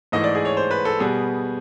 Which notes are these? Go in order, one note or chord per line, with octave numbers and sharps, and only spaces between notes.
G#2 E3 A3 D#5
D5
G#4
C#5
C5
B4
A4
B2 G3 B3 G#4